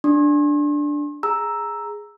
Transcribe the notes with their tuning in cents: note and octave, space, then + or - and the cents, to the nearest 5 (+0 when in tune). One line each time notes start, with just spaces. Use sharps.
D4 +0 C6 +45
G#4 +0 A#5 +0 E6 +0